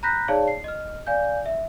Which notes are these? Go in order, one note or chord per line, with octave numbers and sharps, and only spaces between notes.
A#5 B5 F#6 G6 A#6 B6
D#4 G#4 C#5 D5 F5 A5
C7
D#5 F6
D5 F5 G#5 G6
E5